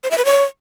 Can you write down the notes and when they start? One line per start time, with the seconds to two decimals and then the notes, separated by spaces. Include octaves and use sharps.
0.04 C5
0.11 E5
0.18 B4
0.25 C#5